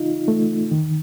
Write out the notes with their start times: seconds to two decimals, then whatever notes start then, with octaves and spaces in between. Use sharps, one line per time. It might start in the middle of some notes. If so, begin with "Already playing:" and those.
Already playing: D#4 F4
0.28 A3
0.71 D#3